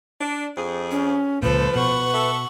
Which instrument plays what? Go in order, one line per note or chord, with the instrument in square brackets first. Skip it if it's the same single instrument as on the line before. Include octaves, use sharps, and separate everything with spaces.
[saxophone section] D4
F2 G#4
[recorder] C#4
[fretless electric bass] C#2 A#2 [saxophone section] F3 [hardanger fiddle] A4 [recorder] B4
[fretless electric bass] B2 [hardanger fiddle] F#5 C#6
[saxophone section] A4 E5